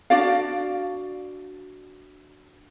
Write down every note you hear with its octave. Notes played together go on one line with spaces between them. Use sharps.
D4 F#4 D5 F5